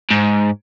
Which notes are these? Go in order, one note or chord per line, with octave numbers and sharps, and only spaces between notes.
G#2